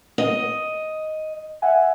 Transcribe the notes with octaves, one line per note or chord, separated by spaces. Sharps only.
D#5
E5 F#5 G#5